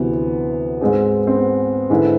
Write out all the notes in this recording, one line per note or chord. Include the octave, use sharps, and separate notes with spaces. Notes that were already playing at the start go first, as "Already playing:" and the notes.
Already playing: D2 C3 E3 B3
G#2 G#3 C4 G#4
C4
B3
G#2 D3 G#3 C4 E4 B4